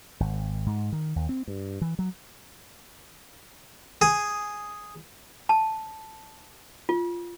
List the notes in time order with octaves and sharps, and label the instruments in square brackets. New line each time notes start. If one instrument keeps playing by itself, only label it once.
[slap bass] G#1
G#2
D#3
D#2
C4
G2
E3
F#3
[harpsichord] G#4
[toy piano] A5
F4